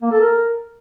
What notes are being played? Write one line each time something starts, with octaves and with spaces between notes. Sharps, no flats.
A#3
A4
A#4